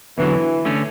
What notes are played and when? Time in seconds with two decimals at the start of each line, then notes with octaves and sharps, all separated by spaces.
0.17 E2 D3 E3 F#3
0.65 D3 A3 C#4